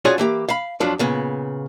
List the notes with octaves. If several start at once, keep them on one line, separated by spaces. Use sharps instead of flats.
C#4 F4 F#4 G#4 C#5 D5
E3 A#3 G4
F5 B5
F2 F3 F#3 D4
A#2 C#3 B3